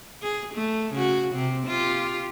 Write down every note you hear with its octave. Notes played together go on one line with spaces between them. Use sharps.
G#4
A3
C#3 F#4
C3 C4
F4 G4